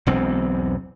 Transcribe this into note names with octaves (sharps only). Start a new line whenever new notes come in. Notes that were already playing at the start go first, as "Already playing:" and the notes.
E1 B1 E2 C4